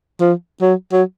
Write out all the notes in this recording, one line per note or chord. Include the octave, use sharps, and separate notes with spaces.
F3
F#3
F#3